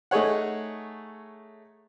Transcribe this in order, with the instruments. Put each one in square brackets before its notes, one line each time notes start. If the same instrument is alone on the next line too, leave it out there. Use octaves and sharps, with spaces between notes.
[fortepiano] A3 D#4 G#4 C#5 F#5